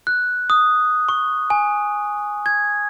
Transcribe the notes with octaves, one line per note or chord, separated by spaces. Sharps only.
F#6
D#6
C#6
G#5
G#6